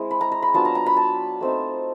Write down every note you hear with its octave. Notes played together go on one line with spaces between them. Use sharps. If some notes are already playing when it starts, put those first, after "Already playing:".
Already playing: G#3 C4 E4
B5
A#5
A#5
B5
F#3 B3 D4 F4 A5
A#5
A#5
B5
A5
A3 C4 D#4